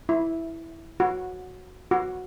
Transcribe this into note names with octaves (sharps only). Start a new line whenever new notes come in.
E4
F#4
F#4